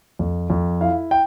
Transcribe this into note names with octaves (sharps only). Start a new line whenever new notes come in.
F2
F2
E4 F5
G5